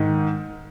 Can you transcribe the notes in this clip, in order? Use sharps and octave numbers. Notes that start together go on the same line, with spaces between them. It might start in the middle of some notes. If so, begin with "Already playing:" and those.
Already playing: G#2 D#3